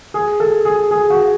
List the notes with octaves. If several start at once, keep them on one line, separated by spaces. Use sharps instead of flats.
G#4
A4
G#4
G#4
F#4